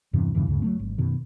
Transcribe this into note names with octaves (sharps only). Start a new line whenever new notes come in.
E2 G2 C3 E3
E2 G2 C#3 E3
D2 G2 C#3
F#3 A3 C4
G#1
F#2 B2 D#3